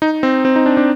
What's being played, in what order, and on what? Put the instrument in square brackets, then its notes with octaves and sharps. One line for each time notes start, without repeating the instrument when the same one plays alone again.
[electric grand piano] D#4
C4
C4
D#4
D4
D4